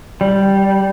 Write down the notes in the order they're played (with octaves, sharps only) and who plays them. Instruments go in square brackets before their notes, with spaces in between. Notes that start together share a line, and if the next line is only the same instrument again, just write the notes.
[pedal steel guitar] G3